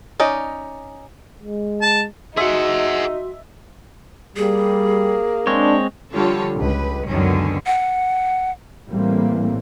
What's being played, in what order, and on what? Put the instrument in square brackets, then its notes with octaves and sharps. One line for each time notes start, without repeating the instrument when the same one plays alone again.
[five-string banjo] C#4 D#4 D5 D#5
[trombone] G#3
[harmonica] A5
[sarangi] D#4 [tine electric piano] F#4 C6 [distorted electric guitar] G#4 F#5 [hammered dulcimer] E5
[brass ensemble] G3 [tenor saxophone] A#3 [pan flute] G#4
[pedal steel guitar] G#3 C4 C#5 [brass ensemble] D4
[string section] D3 F3 G3 F4 A4 C#5
C#2 B4
C#2 F#2 B2 D3 D#3 C#4
[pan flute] F#5
[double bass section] A2 E3 G3 A#3 C4